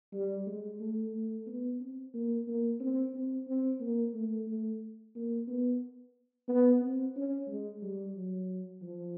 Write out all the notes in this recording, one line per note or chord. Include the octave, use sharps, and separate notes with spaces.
G3
G#3
A3
A3
B3
C4
A#3
A#3
C4
C4
C4
A#3
A3
A3
A#3
B3
B3
C4
C#4
G#3
G3
F#3
F3